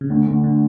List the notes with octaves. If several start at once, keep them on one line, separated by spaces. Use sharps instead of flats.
C#3
D2 D3
D2
D3